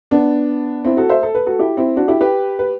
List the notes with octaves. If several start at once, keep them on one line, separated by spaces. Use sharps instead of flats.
B3 D4
C4 E4
F#4 A4
C5 E5
A4
B4
F#4 A4
E4 G4
C4 E4
D4 F#4
E4 G4
G4 B4
B4